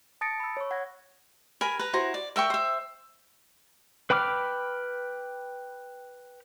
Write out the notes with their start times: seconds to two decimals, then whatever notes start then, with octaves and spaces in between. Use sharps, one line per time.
0.21 A5 D#6 A6 A#6 C#7 D7
0.40 B5 E6
0.57 C#5 C#6
0.71 F#5 G#6 A#6
1.61 A#4 G#5 B5
1.79 B4 A#5
1.93 E4 F#4 C5 A#5
2.14 D5
2.36 A#4 E5 G5 C#6
2.50 C5 E5
4.10 B4 G5 B5 D6 F6